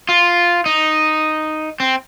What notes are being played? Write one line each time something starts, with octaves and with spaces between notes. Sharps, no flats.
F4
D#4
C4